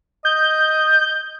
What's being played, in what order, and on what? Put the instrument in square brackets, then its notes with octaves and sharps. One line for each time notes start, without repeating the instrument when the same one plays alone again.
[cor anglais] D#5 [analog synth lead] G6